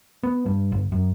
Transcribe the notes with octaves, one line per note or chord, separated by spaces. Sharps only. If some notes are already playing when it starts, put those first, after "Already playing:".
B3
G2
G1
F#2